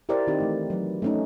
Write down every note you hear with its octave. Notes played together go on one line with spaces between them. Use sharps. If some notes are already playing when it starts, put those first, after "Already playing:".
E4 G4 A#4 C5 D5
D#3 C4 D#4 G4
E3 A3
F#3 B4
A3 C#4 D#4